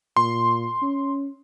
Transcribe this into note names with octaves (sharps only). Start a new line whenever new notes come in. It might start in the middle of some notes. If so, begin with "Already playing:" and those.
A#2 C6
C#4